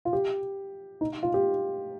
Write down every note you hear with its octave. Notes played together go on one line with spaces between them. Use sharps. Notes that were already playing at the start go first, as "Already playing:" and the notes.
F4
G4
D#4
F4
G4